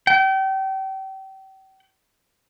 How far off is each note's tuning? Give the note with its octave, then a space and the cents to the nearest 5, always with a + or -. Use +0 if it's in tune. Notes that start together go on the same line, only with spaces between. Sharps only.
G5 -35